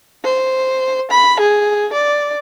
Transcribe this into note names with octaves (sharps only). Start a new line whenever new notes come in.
C5
B5
G#4
D5